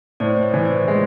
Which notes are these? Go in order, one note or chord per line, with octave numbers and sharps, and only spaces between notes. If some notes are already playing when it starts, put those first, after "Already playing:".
A2 C5 D5
D5
B4 C#5
E3
C5 D5
G#3